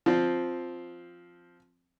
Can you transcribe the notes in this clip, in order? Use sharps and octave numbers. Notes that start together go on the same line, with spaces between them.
F3 C4